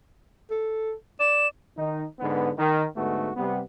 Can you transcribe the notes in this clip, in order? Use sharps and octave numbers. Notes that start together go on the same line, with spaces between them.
A4
D5 E7
D#3 D#4
G#2 D3 B3
D#3
G#2 D3 A3 B3 F#4
C3 G3 B3